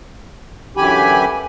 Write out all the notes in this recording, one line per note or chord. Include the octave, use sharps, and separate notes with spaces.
F#2 D3 E3 G4 G#5 B5